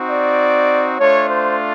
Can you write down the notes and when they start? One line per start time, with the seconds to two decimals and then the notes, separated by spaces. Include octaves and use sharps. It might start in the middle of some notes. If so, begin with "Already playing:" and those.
Already playing: C4 D#4 F#4
0.09 D5
0.99 A3 D4 F4 C#5
1.29 C5